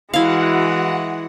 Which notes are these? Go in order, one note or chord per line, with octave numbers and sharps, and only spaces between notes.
E3 G#3 E4 F#4 F5 F#5